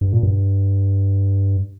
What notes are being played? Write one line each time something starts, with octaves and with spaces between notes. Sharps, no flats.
G2
A#2
G2